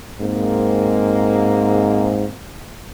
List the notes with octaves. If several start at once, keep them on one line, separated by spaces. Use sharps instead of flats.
G#2 G#3 A#3 C4